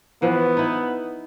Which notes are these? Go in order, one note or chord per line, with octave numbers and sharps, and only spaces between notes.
E3 F3 B3
D#4 E4